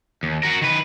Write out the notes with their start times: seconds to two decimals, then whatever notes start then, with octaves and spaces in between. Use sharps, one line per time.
0.23 D#2
0.43 F#4 A#4
0.61 D#3 B4